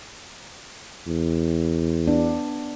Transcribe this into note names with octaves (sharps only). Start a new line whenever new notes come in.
E2
B3 D4